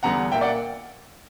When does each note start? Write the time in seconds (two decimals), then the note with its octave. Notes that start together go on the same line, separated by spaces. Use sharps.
0.03 E2 D3 G3 B3 F#5 A#5
0.32 A#2 A#3 E5 G5
0.41 D5 F#5